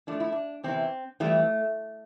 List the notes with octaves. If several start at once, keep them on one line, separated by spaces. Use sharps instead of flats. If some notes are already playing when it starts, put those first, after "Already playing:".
A2 F3 A3 D4
E4
D4
E2 C3 E3 C4
F2 E3 G3 A3